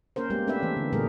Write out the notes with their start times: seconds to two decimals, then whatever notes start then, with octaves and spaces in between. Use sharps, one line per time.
0.16 A#3 C#4 A#4 C5
0.30 G3 G#3 A#3 B3 G4 A#4
0.47 A3 C4 D4 G4 B4 E5
0.60 E3 C#4
0.77 D3
0.93 A#2 G3 A3 G#4 A#4 B4